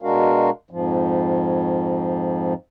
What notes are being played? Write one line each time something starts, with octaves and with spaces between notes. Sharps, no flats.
B2 G#3 D4 F#4 A#4 F5
F2 G#2 F3